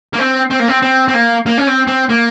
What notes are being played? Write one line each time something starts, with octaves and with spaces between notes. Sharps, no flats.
A#3
C4
C4
A#3
C4
C4
C4
A#3
A#3
C#4
C4
C4
A#3